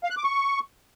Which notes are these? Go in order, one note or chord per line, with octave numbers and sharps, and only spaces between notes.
F5
F#6
D6
C#6